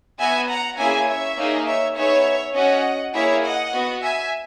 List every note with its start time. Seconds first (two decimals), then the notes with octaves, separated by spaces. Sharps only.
0.19 B3 F#4 E5 G#5
0.49 F#5 A#5
0.78 A#3 C#4 E4 G#4 E5 G#5
1.07 C#5 E5
1.37 A#3 D#4 G#4
1.67 C#5 E5
1.96 B3 D#4 G#4 C#5 E5
2.55 C#4 F#4 D#5 F#5
3.14 A#3 E4 G#4 C#5 E5
3.44 D#5 F#5
3.73 B3 F#4
4.02 E5 G#5